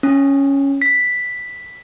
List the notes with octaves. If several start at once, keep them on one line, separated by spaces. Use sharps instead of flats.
C#4
B6